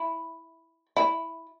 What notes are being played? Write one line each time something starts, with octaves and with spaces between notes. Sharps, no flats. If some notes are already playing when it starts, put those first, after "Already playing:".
Already playing: E4
E4